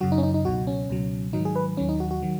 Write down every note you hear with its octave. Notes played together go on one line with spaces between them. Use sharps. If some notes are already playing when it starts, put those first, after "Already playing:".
F#2 C#3 F#3 F#4
D#4
C#4
D#4
D#4
C#2 B2 F#3 F#4
C#4
C#2 B2 F#3
G#2 D#3 F#3 D#4
G#4
B4
D#2 D#3 F#3 C#4
D#4
F#4
F#4
D#3 F#3